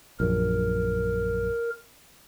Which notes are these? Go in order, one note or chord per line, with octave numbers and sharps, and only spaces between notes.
A#1 F#2 A#4